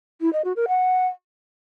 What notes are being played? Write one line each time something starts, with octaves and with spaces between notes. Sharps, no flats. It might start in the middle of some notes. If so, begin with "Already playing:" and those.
E4
D#5
F#4
A#4
F#5